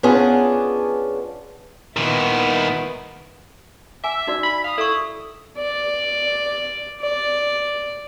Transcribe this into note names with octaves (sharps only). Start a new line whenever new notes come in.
B3 C#4 D4 F4 G#4 C#5
A#2 D#3 B3 E4
E5 F#5 G#5 D6 E6
D#4 F#4 D5
B5 B6
F5 D#6
E4 A4 C#6
D5
D5